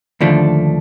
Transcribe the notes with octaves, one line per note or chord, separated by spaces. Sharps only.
D#2 D3 F3 A3 D4